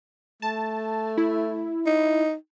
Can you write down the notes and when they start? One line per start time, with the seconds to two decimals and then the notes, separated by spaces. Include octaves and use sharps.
0.42 A3 A5
1.18 E4
1.86 D#4